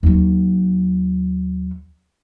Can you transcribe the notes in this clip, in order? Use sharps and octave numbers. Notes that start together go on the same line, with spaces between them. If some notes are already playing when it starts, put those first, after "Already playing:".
D#2 F#3